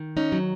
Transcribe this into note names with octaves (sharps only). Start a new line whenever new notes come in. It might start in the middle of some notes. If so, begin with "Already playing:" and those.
Already playing: D#3
C#4 D#4
F#3